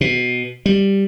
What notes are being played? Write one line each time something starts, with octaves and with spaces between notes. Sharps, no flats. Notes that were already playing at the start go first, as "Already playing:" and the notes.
B2
G3